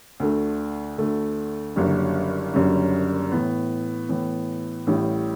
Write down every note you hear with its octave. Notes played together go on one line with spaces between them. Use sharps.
D2 D3 A3
D2 D3 A3
F#1 F#2 D3 G3 C#4
F#1 F#2 D3 G3 C#4
A2 E3 B3
A2 E3 B3
A1 A2 E3 G3